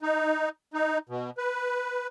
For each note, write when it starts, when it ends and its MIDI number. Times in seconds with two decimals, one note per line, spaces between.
0.02 0.49 63
0.74 0.98 63
1.09 1.30 47
1.38 2.07 71